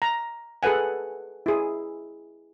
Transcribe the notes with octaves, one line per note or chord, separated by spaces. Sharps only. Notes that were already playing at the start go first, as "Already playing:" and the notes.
A#5
G#4 A4 B4 F#5 G#5
E4 G#4